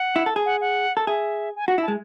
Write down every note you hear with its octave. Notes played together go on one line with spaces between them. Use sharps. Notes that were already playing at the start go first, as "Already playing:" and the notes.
Already playing: F#5
E4
A4
G#4
F#5
F#5
A4
G#4 E5
G#5
F#4 F#5
E4
A5
G#3